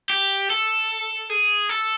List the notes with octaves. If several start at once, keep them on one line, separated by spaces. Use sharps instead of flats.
G4
A4
G#4
A4